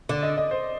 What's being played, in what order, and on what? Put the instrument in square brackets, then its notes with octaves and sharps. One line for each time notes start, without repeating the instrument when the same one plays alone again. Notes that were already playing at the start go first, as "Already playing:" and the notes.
[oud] D3 [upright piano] D5
[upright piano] D#5
D#5
C5